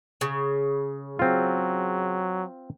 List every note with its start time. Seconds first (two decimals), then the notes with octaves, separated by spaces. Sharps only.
0.21 C#3
1.19 F#3 C4 F4